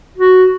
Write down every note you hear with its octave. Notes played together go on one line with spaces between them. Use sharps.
F#4